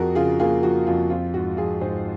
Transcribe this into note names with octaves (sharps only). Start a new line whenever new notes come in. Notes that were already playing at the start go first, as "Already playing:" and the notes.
Already playing: F2 F3 F#4 G#4 A#4
C#3 F4 G#4
A#3 F4 G#4
F3 F#4
F2 F4
C4 F4
G#2 F#4
F3 F4 G#4
G#2 G#4 C5